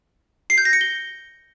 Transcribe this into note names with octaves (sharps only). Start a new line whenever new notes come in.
C7
G6
A#6
C#7
G7